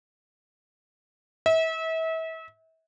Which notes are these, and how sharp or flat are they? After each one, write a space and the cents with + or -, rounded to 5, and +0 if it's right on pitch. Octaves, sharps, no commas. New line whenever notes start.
E5 -35